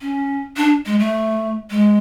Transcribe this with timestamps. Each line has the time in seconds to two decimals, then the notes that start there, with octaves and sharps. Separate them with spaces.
0.01 C#4
0.57 D4
0.86 G#3
0.99 A3
1.70 G#3